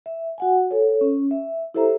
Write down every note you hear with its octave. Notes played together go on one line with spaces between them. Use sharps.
E5
F#4 F#5 G#5
A4 C#5
C#4
E5
E4 G4 A4 C5 E5 A#5